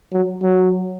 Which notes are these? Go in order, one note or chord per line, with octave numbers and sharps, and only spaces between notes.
F#3
F#3